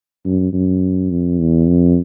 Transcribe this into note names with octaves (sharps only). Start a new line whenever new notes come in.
F#2
F#2
F2
E2
F2